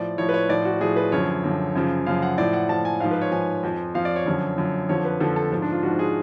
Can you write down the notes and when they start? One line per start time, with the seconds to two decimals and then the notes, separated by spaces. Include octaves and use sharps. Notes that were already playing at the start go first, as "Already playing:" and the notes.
Already playing: A2 F3 D5
0.18 A2 F3 C#5
0.29 B4
0.34 C#5
0.49 A2 F3 D5
0.65 F#4
0.81 A2 F3 G#4
0.96 B4
1.12 F#2 D3 F3 C#5
1.44 F#2 D3 F3
1.75 F#2 C#3 F3
2.06 F#2 C#3 F3 F5
2.22 F#5
2.38 A2 F3 D5
2.53 F#5
2.69 A2 F3 A5
2.85 G#5
3.00 G#2 F3 F5
3.11 B4
3.22 C#5
3.31 G#2 F3 G#5
3.63 F2 F3
3.95 F2 F3 F5
4.05 D5
4.16 C#5
4.26 F#2 D3 F3
4.58 F#2 D3 F3
4.89 F2 D3 F3 C#5
5.05 B4
5.20 F2 D3 F3 A4
5.36 A4
5.51 G#2 F3
5.62 D4
5.72 F4
5.83 G#2 F3 F#4
5.99 G#4